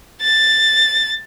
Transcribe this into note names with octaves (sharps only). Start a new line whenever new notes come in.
A6